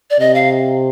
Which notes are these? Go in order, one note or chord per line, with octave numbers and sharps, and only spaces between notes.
D5
C3 D#5
F5